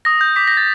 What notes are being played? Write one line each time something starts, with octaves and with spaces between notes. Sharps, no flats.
D#6 A#6
G6
D6 B6
G6 A#6
A6